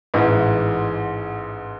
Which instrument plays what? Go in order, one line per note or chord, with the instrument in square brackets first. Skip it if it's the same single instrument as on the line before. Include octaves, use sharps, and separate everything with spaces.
[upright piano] A1 G#2 E3